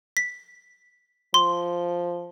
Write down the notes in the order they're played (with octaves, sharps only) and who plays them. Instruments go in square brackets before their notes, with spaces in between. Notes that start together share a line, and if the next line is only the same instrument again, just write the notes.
[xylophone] B6
[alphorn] F3 [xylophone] C6